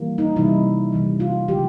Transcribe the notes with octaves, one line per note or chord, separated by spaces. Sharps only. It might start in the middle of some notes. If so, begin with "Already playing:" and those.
Already playing: E3 G3 A#3
D#4
C3 E3 G3 E4
C3 E3 G3
F4
C#3 F3 G#3 B3 G4